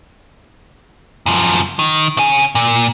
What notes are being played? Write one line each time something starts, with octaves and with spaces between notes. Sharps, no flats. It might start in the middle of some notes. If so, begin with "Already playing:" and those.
F#2 F3
D#3
C#3 G#5
A#2